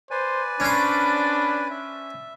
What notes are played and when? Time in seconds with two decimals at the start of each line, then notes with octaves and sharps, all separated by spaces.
0.11 B4 C5 D5 G#5
0.60 C#4 D4 C5 B5
1.70 E5